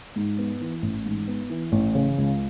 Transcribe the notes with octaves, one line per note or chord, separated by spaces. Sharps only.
G#2
B3
E3
A1
G#2
B3
E3
A1
C#3
C#2